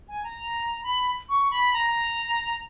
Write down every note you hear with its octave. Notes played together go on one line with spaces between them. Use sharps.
G#5
A#5
B5
C#6
B5
A#5